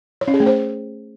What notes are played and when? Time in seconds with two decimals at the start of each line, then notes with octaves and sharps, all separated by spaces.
0.21 C#5
0.28 C#4
0.34 G#4
0.40 A3
0.46 C5